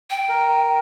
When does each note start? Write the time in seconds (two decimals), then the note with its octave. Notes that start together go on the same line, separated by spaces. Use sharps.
0.10 G5
0.29 A#4